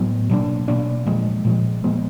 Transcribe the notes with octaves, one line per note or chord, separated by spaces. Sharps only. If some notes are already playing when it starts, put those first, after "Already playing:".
Already playing: A2 F#3 B3
B2 F#3 A#3 D4
B2 F#3 A#3 D4
A#2 F3 G#3
A#2 F3 G#3
A#2 F3 G#3 B3